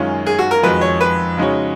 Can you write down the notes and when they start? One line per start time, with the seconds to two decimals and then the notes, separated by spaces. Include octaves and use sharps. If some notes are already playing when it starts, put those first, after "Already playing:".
Already playing: F#2 D#3 G#3 C#4 F4
0.26 G#4
0.39 F#4
0.51 A#4
0.63 F2 D#3 G#3 D#4 F#4 B4
0.81 C#5
1.01 B4
1.38 C#3 G#3 D#4 F#4 C#5